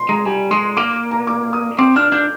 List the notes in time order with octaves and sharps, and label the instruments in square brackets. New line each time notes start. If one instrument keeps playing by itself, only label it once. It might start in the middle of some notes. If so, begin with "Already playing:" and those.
Already playing: [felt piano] C6
[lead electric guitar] G#3 [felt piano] A#5
[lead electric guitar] G3 [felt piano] G#5
[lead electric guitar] G#3 [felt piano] C6
[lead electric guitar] A#3 [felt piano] D6
[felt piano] A#5
D6
D#6
[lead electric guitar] C4 [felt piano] D6
[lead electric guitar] D4 [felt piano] F6
[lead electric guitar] D4 [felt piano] G6